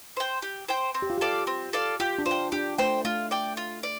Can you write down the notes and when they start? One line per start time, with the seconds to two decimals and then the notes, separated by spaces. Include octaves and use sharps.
0.17 C5 G5
0.42 G4
0.69 C5 G5
0.94 C4
1.02 G4
1.10 F4
1.18 G4 A4 D5 F5
1.47 C4
1.73 A4 D5 F5
2.00 F4 G4
2.18 D4
2.26 F4 C5
2.31 G5
2.52 D4 G4
2.78 A3 C5 G5
3.05 A3 F4
3.31 D5 G5
3.57 F4
3.83 D5